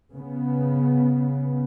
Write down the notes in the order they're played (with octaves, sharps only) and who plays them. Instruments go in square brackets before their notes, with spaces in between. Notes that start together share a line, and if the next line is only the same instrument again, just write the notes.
[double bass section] C#3 B3